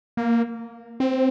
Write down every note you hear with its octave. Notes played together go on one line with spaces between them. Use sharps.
A#3
C4